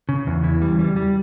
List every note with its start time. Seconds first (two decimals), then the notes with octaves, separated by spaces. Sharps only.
0.09 C#3
0.27 E2
0.44 E3
0.62 G3
0.79 G3
0.96 G3